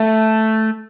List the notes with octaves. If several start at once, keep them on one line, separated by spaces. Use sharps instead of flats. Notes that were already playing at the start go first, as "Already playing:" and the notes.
Already playing: A3